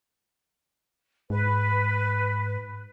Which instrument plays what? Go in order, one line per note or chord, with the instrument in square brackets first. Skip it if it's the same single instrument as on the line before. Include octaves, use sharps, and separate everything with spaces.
[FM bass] G#2 [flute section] B4